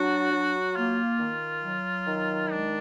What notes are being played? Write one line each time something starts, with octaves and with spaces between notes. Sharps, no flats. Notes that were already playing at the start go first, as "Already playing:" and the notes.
Already playing: F#3 D4 F#4
F#3
A#3 F4
D#3
F#3
D#3
G#3 D4